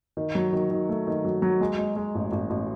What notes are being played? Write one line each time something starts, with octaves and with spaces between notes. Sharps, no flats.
D#3
F#3
D#3
D#3
A3
D#3
F#3
F#3
G#3
G#3
G#3
A1
A1
A1